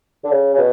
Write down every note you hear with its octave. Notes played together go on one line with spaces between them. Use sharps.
D3
C#3
C#3
B2